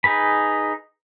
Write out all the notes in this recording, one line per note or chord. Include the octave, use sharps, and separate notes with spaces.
D#4 G#4 B4 B5